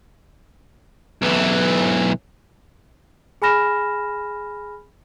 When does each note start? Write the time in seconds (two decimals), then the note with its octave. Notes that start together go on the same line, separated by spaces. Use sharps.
1.22 B1 E3
3.42 G#4 G#5 B5 F6 A#6 E7